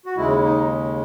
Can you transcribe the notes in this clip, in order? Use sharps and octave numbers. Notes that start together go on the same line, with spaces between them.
F#4
D#2 C#3 G#3 E4
D#4